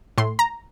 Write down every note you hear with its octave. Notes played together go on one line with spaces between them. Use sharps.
A2 C6
A#5